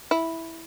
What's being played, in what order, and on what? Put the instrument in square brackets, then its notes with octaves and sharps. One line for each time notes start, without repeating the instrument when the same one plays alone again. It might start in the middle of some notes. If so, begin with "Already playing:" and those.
[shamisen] E4